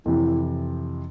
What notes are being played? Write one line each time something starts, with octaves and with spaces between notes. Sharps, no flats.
F2 C3 E3 E4